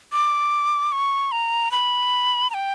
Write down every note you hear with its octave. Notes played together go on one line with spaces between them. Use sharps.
D6
C#6
A#5
B5
A#5
G5